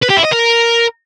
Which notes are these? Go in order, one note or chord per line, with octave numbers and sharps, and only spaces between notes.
B4
G4
E4
D#5
A#4